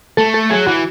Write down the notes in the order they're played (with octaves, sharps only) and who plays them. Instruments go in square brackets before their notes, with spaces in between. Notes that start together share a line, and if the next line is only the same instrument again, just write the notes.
[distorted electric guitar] A3 [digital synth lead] A4
[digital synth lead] A4
[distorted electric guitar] F#3 [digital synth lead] G#4
[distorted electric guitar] E3 [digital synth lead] F#4